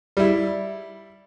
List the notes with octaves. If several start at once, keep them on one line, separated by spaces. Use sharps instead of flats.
G3 E4